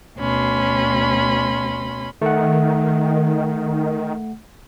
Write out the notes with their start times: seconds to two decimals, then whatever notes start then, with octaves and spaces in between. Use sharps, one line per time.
0.18 D2 B2 C#4 B5 C6
2.22 D#3 A3 F#5